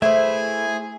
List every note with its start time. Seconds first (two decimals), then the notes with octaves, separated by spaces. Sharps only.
0.02 E3 A3 E4 G#4 C5 E5 G#5